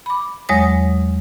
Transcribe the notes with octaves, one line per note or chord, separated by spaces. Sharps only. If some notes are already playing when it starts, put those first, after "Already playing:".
B5 D6
E2 F#3 G#3 C#5 D#6 A#6